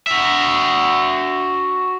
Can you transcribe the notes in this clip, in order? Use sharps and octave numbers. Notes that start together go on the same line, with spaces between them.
F#4 E5